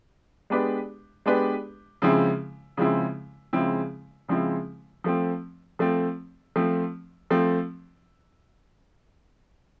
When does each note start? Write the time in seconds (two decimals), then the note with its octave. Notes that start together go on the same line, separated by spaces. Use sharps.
0.50 G#3 B3 D4 G4 B4
1.26 G#3 B3 D4 G4 B4
2.02 C#3 F3 G#3 C4 E4
2.77 C#3 F3 G#3 C4 E4
3.53 C#3 F3 G#3 C4 E4
4.28 C#3 F3 G#3 C4 E4
5.04 F3 A3 C4
5.79 F3 A3 C4
6.56 F3 A3 C4
7.30 F3 A3 C4